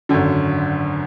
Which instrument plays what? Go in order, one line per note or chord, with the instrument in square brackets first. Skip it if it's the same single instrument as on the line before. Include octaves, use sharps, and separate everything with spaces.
[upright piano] G#1 F#2 D3